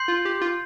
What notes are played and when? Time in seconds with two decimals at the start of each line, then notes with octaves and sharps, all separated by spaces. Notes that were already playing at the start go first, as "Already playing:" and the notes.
Already playing: C6 G6 C7
0.08 F4
0.25 G4
0.41 F4